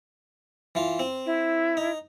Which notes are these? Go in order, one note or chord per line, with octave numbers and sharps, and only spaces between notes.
E3 F4
C4
E4
D#4